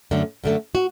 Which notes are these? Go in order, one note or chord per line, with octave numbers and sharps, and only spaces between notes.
F#2 D3 A3
F#2 D3 A3
F#4